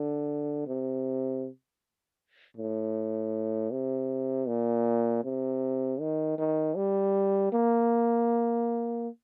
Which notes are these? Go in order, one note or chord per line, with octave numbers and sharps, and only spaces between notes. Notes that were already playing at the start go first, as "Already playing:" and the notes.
Already playing: D3
C3
A2
C3
A#2
C3
D#3
D#3
G3
A#3